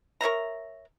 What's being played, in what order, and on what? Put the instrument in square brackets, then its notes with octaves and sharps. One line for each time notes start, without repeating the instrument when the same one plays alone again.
[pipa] A#4 C#5 E5 A#5